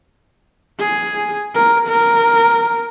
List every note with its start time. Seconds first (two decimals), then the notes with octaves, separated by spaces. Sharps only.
0.79 G#4
1.55 A#4
1.88 A#4